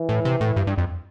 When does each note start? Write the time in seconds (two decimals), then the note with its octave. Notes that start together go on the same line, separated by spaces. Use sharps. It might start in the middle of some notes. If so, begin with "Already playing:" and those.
Already playing: E3
0.09 A2
0.25 C3
0.41 A2
0.56 G2
0.67 G2
0.78 F2